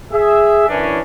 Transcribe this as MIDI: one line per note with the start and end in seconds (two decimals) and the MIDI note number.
0.12 0.66 68
0.12 0.66 76
0.68 0.99 42
0.68 0.99 52
0.68 0.99 61
0.68 0.99 62